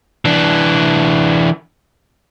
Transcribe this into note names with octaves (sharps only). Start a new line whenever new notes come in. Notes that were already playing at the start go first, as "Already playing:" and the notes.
E3 D4